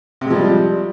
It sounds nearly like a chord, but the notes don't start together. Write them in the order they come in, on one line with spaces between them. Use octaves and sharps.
C3 G#3 F3 G3